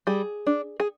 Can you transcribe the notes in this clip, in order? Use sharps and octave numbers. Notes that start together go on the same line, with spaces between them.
G3 G#4
D4
G#4